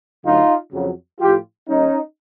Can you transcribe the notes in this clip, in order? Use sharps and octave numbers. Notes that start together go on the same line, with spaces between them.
D2 D3 F#3 D#4 F4
F2 C#3 F#3
A2 F3 F4 G4
D#2 D#3 G3 C#4 D#4